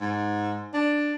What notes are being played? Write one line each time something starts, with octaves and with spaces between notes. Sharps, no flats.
G#2
D4